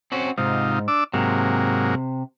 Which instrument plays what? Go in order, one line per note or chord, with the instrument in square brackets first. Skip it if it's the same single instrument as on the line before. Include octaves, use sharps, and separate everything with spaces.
[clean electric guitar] C4 C#4 F#4
[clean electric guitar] G#2 [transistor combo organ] C3 D#4 F4
[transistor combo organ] D4 D6 E6
[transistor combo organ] G#2 F#3 A#3 [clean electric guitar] C3